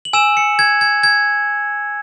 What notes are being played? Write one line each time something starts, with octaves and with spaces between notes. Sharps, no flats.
F#7
G#5 E6 E7
C#7
G#6
G#6
G#6